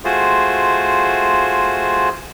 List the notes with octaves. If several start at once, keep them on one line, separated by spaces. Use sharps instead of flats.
A3 F4 F#4 G#4 C5